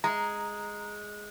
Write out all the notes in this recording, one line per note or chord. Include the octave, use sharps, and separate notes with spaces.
G#3 A#5